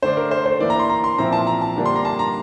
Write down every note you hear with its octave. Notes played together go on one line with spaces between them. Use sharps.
D3 A3 D4 C5
A#4
C5
C5
E3 A#3 E4 D5
A#5
C6
A#5
C6
A#2 F3 C4 E4 A#5
A5
A#5
A5
D3 G3 A#3 D4
C6
A#5
A5
A#5